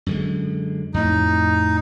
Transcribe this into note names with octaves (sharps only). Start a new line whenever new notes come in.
F#2 D3 G#3
F2 A2 D#4